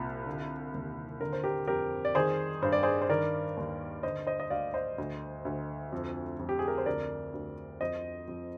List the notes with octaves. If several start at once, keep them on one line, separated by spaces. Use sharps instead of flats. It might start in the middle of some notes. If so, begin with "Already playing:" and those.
Already playing: C2 A#2 F4
D3
D#2
D3 A#4
C5
G4 A#4
F2 G4 A#4
D5
D#3 G#4 C5
G2 C5
D5
G#4 C5
C5
D#3 A#4 D5
D#2
D3 C5 D#5
C5 D#5
D#5
D2 D5 F5
C5 D#5
D2
D2
F2
F2
G4
G#4
A#4
C5
D2 A#4 D5
D2
F2 C5 D#5
F2